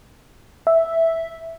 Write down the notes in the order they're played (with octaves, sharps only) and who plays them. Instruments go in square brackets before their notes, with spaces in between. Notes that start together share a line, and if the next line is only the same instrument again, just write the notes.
[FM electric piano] E5